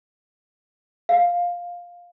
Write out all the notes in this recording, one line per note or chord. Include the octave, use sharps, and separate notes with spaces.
F5